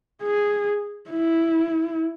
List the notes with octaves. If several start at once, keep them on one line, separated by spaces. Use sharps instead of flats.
G#4
E4